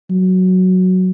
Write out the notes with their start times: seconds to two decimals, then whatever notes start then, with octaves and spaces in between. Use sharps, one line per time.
0.11 F#3